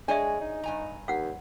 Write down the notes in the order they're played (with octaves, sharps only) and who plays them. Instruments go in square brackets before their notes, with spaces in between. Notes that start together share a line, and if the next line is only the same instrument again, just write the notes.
[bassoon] G#3 [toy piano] D4 D5 E5 [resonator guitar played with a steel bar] G#4 C#5 G#5
[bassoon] D#4
[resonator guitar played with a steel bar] G2 G#5 A#5
[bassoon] D#2 [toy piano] F5 F#5